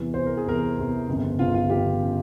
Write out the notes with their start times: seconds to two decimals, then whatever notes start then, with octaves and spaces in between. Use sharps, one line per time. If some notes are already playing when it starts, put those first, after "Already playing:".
Already playing: E2 C3 E3
0.14 E2 C3 E3 C5
0.26 A#4
0.37 G#4
0.46 E2 C3 E3 A#4
0.77 E2 C3 E3
1.08 G1 F2 C#3
1.38 G1 F2 C#3 F4
1.55 F4
1.69 G1 F2 C#3 G4
2.03 C#3